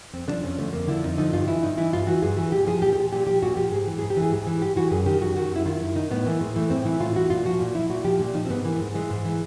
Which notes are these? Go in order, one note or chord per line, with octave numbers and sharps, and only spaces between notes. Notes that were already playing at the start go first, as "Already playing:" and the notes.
F2 C4
D3 F3 D4
F2 C#4
D3 F3 A3
F2 A#3
D3 F3 E4
F2 D#4
D3 F3 D#4
G2 F4
E3 E4
G2 D#4
E3 E4
G2 F4
E3 F#4
G2 G#4
E3 F#4
A#2 G4
F3 G#4
A#2 G4
G4
F3
A#2 G4
F3 G4
A#2 F#4
F3 G4
G#2 G#4
E3
G#2 G#4
G4
E3
G#4
G#2
E3
G#2 G4
E3 F#4
F#2 G#4
D#3 G4
F#2 F#4
D#3 F#4
F#2 E4
D#3 F4
F#2 E4
D#3 D#4
A2 B3
E3 A#3
A2 G#3
E3 A3
A2 C4
E3 E4
A2 F4
E3 F#4
A#2 F4
F3 F#4
A#2
F3 E4
A#2 F#4
F3 G4
A#2 D4
F3 D#4
C4
G#2 B3
E3 A#3
G#2
E3 G#3
G#2
E3